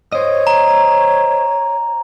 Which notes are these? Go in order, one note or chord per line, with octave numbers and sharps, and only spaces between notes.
C5 C#5 D#5
A#5